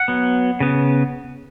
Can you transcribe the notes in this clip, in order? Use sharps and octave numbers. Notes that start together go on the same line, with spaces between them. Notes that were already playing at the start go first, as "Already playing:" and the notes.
Already playing: F#5
F#3 B3
C#3 B3